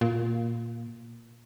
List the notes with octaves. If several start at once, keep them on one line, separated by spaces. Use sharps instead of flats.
A#2